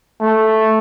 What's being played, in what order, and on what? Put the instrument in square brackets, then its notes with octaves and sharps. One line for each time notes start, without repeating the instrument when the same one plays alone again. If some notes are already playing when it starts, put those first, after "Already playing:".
[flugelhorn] A3